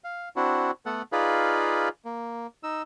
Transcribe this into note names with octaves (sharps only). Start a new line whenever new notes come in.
F5
C4 D4 E4 F#4
A3 B3 A4 F#5
D#4 F4 G#4 B4 D5 F5
A#3
D#4 E6